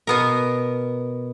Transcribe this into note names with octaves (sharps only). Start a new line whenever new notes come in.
B2 B3 A#4